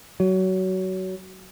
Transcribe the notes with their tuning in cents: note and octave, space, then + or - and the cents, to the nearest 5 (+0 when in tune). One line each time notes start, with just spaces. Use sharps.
F#3 +20